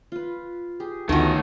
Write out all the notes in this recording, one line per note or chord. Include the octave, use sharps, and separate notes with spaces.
F4 B4
G4 G#4
D2 D#3 A3 B3 C#4 F4 F#4 C6